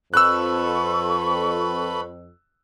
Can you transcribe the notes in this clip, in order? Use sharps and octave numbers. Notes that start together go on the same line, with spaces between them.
F2 A4 B4 B5 C#6 E6 F#6